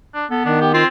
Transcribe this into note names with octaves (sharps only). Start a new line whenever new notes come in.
D4
B3 A4
D#3 D4
G4
C4 F4